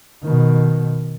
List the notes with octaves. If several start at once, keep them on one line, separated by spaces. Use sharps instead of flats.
B2 D#3